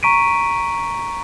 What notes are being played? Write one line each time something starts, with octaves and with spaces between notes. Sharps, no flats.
A#5 C#6 B6 D7 D#7